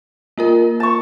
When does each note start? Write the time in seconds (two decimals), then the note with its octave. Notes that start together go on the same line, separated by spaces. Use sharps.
0.38 A#3 F4 A#4
0.80 A5 C#6